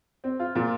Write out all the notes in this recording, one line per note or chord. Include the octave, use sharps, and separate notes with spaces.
C4
F4
A#2